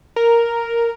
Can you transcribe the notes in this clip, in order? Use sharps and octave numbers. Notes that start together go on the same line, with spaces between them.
A#4